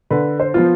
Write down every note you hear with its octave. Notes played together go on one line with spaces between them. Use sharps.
D3 B4
C5
F3 B3 F4